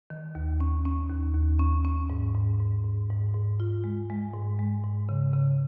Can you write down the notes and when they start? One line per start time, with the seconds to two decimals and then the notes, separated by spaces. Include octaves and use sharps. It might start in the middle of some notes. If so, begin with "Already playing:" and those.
0.10 D#3
0.35 D#2
0.60 C#4
0.85 C#4
1.10 D#2
1.35 D#2
1.59 C#4
1.85 C#4
2.10 G#2
2.35 G#2
2.60 G#2
2.84 G#2
3.10 G#2
3.34 G#2
3.60 F4
3.84 G#3
4.10 G#3
4.34 G#2
4.59 G#3
4.84 G#2
5.09 C#3
5.33 C#3